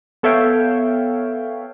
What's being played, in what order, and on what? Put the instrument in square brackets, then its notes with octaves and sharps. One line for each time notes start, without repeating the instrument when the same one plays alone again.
[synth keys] B3 A4 C#5 E5 F5 G5